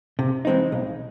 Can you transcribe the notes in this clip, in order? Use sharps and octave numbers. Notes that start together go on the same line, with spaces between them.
C3
E3 G#3 C4 D#4
B1